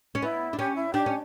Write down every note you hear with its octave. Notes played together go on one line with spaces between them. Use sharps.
C#4
B3 E4
D4
C#4 G4
E4
D4 G4
C#4